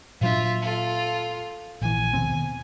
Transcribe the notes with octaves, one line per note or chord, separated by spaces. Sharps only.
A#2 F#3 D4 F4 E5
F4 A4
A#1 E3 G#5
D#2 B2 C4